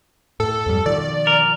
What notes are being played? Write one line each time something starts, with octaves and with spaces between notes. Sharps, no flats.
A2 A4
F2 G#2 G3
B2 D#3 F3 D5
A#4